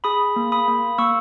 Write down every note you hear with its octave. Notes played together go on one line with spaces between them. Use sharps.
G#4 B5 D#6
A#3
B5 D#6
A#3
A#3 C#6 E6